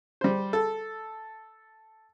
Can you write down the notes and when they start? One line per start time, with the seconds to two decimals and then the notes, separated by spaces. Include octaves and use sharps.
0.21 G3 C5
0.53 A4